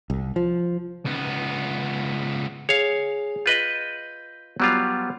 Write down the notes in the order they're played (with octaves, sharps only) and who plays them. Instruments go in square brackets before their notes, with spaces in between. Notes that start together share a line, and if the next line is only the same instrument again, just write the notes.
[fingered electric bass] C2
F3
[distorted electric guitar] C#2 B3
[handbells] G#4 [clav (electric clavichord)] C#5 F5
[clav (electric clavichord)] F4 B4 D#5 [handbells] G6
[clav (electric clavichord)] F#3 G3 F4 [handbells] B3